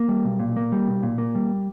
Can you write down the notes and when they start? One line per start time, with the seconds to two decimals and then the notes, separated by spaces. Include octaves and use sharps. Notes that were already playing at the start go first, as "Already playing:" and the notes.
Already playing: A#3
0.09 G3
0.24 B1
0.40 A#2
0.56 A#3
0.72 G3
0.88 B1
1.03 A#2
1.18 A#3
1.35 G3